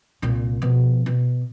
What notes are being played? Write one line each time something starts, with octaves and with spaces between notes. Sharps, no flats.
C2 A#2
B2 F3
B2